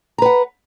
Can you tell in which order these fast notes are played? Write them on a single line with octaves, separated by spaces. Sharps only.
A#5 B4 F#5